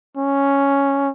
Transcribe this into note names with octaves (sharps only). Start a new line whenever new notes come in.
C#4